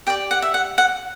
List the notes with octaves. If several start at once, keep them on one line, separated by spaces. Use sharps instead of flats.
G4 D5 G5
F#5
E5
F#5
F#5